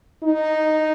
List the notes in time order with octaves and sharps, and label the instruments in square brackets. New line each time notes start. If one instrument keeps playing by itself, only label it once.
[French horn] D#4